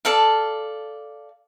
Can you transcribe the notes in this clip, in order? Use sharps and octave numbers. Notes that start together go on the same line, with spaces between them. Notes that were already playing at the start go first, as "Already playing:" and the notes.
A4 D5 F5